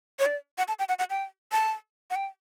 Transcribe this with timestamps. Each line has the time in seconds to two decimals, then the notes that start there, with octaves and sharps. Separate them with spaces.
0.19 C#5
0.26 D5
0.58 F#5
0.68 A5
0.79 G5
0.89 F#5
0.99 F#5
1.10 G5
1.52 A5
2.10 F#5
2.16 G5